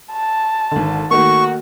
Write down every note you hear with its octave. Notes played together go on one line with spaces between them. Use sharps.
A5
G#1 D3
D#3 A3 A#3 F#4 C#6